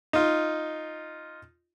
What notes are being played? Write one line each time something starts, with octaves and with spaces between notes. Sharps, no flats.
D#4 F4